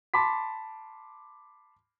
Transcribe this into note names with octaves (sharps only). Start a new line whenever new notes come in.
A5 B5 C6 D6 B6